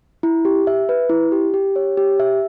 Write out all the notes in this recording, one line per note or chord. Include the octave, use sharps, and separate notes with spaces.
E4
G4
E5
B4
E4
G4
G4
C#5
G4
E5